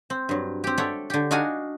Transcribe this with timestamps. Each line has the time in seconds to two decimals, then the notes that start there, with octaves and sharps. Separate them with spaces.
0.10 C4
0.29 G2 F#3
0.64 C4 G4
0.78 A4 C#5 D5 E5 F#5 G5
1.10 D3 G4
1.31 D4 D#4 F#4 F5 F#5 G#5